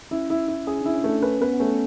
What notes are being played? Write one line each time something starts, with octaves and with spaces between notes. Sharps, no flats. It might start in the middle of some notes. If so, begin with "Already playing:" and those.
C#4 E4
E4
E4
C#4 G#4
D4 E4
C#4
A3
D4
C#4 B4
B3 B4
B3
A3 C#4